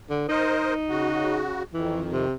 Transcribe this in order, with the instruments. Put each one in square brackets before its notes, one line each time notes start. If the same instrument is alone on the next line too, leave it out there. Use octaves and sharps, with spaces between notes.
[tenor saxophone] D3
[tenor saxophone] D#4 [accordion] A#4 C5 D#5
[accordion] C#3 F#4
[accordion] F2 D#3 [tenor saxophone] E3
[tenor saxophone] C3